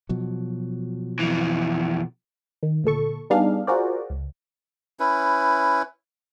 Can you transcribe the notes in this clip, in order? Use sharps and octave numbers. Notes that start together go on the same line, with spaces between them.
B2 F3 F#3
F2 E3
D#3
D2 A#2 A4 C#6
G3 B3 D4 D#4 G#4 F5
F4 F#4 G#4 A#4 C5 D5
C#2
C#4 E4 B4